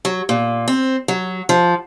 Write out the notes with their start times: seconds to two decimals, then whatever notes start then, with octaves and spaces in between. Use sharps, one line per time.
0.05 F#3
0.29 A#2
0.68 C4
1.08 F#3
1.49 F3